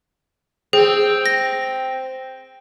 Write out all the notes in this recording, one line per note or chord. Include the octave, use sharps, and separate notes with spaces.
C4 G#4
A#6